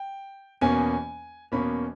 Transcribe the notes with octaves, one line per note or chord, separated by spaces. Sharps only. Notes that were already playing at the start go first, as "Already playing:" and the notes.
Already playing: G5
E2 B2 A#3 C#4 G#5
E2 B2 A#3 C#4 B5